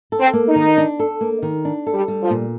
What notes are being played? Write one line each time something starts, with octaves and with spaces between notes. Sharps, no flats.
A4
C4
A#3
D#4
D#3
D4
A4
A#3
D#3
D4
A4
G3
G3
F3
A#2